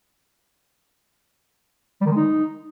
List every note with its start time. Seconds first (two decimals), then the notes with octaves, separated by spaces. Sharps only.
2.01 G3
2.06 D#3
2.11 G#3
2.16 D#4